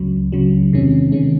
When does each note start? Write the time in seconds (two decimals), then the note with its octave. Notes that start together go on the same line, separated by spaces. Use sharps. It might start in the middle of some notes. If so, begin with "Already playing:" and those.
Already playing: C#2 C#3 F#3
0.32 C#2 C#3 F#3
0.72 E2 C3 D#3 G#3 C#4
1.12 C3 D#3 G#3 C#4